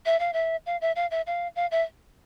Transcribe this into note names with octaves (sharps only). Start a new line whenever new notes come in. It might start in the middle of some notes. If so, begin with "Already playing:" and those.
E5
F5
E5
F5
E5
F5
E5
F5
F5
E5